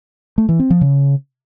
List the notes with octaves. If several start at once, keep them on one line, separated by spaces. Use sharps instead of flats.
A3
E3
C4
F3
C#3